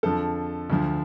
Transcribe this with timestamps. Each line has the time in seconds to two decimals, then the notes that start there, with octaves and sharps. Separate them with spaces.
0.03 F2 D3 F3 A4
0.70 D2 D3 F3